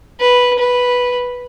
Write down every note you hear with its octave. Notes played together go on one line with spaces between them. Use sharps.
B4
B4